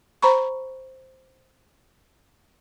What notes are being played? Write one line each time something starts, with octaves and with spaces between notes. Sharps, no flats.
C5 A#5 B5 C#6